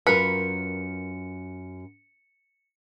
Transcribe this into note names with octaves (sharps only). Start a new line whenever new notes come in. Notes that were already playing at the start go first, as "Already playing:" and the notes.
F#2 F4 A#4 B4 C#7